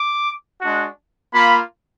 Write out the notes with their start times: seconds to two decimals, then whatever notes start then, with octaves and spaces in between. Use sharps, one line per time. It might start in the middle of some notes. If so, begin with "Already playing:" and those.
Already playing: D6
0.60 G#3 D4 F#4
1.32 A#3 F4 B5